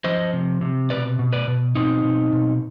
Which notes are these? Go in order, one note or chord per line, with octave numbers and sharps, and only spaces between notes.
F3 C5 D#5
C3
C3
B2 B4 D5
B2
B4 D5
B2
B2 C4 D#4
B2
B2